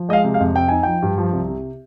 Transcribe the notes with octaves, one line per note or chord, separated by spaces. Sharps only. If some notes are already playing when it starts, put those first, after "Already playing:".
Already playing: F3
G#3 D#5 F5
C3
F5
F2
C4 G5
D#4 G#5
F3 G5
G2
F3
C2
C3